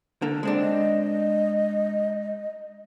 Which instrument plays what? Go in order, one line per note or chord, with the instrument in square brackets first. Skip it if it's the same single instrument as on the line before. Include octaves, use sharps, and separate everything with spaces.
[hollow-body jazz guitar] D3 A#3
G#3 C4 D4
[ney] D#5